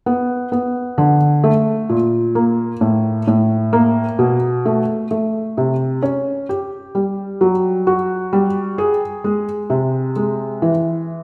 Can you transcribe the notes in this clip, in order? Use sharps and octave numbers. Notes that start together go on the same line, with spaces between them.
B3
B3
D3
A3
A#2
A#3
A2
A2
A#3
B2
A3
A3
C3
C#4
G4
G3
F#3
F#4
G3
G#4
G#3
C3
G#3
E3